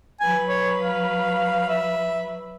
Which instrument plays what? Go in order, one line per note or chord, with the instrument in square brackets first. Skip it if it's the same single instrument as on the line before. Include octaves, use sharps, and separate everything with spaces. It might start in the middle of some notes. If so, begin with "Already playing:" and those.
[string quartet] F#3 B4 [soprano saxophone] G#5
[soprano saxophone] C#5
F5
E5